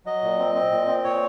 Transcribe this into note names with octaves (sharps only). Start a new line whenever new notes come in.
F#3 D#5
A#2
C4
C4
A#2
C4
A#2 C#5